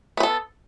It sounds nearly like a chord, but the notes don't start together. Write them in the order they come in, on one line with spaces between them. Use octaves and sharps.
B3 B4 A4